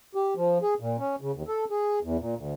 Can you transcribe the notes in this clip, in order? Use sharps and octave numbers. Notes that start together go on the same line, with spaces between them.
G4
F3
G#4
A#2
C#4
C#3
D#2
A4
G#4
E2
A#2
D2